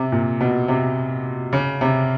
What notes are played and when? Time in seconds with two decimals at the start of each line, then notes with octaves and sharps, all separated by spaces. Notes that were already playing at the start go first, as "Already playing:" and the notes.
Already playing: C3
0.12 A#2
0.41 B2
0.68 C3
1.53 C#3
1.81 C3